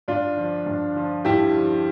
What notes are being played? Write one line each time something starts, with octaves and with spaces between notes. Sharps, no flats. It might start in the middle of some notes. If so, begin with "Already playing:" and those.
G2 D4 F4
F3
G2
F3
G2 E4 G4
F3